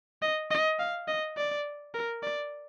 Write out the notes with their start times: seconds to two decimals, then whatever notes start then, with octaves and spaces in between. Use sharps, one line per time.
0.22 D#5
0.51 D#5
0.79 F5
1.08 D#5
1.37 D5
1.94 A#4
2.23 D5